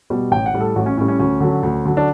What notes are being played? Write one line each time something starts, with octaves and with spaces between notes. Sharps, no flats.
B2 G3
A1 G5
F#5
A2 G3
A4
A1 F#4
C#4
A2 G3 C#4
C#4
D2 C#4
D3 F#3
D2
D3 F#3
D4